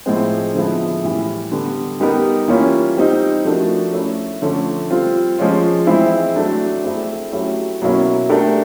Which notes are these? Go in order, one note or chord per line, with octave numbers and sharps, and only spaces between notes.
A2 F3 G#3 C4
D3 F3 G#3 B3 E4
A2 E3 G3
D3 G3 B3
G3 B3 D#4 G4 A#4
E3 G3 A#3 C#4 F4
G3 C4 D#4 G4
F3 A3 D4 F#4 A#4
A3 C#4 E4 A4
D3 F3 A3 C#4
G3 C4 F4
F3 G#3 C#4 F4
E3 G#3 C4 E4
F#3 A3 D4
A3 C4 E4 G#4
F#3 A3 C#4 E4 G4
B2 F#3 A#3 C#4 E4
A3 D4 G4 A#4